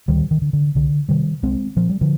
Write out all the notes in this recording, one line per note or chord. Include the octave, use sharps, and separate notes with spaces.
D2 D#3 G3
D#3
D3
D3
C2 D3
C3 D#3 G3
C2 G#3 C4
A#2 F3
G3
D3 F3